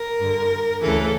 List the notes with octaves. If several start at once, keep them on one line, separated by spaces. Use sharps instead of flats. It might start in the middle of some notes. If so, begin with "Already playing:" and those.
Already playing: A#4
G2 D3
D2 C#3 E3 A4